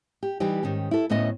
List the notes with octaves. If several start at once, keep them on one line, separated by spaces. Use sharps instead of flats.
G4
E3 G3 D#4 G4
G#2 D#3 C#4 G4
E4 A4
D2 A2 B3 C#4 D#5 E5